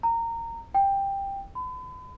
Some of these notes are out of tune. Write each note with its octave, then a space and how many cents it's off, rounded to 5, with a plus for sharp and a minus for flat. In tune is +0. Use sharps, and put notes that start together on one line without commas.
A#5 -20
G5 +10
B5 +40